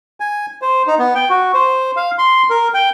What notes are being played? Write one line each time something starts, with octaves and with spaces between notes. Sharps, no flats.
G#5
C5
D#4
B3
G5
F#4
C5
F5
C6
A#4
G5